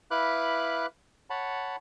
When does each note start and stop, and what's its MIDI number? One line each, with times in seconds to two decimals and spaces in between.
0.11 0.86 64
0.11 0.86 71
0.11 0.86 77
0.11 0.86 83
0.11 0.86 86
0.11 0.86 90
1.30 1.76 73
1.30 1.76 78
1.30 1.76 81
1.30 1.76 83